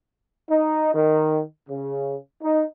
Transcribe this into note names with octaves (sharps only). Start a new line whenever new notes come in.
D#4
D#3
C#3
D#4